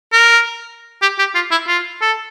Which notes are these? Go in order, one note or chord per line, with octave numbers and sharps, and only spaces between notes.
A#4
G4
G4
F4
E4
F4
A4